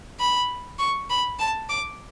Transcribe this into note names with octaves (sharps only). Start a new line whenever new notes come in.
B5
C#6
B5
A5
D6